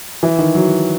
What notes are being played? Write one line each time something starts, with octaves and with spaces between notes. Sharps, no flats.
E3
D#3
F#3